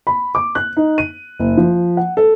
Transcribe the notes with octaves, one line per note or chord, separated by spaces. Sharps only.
B5
D6
F#6
D#4
D#7
F#1
F3
F#5
A4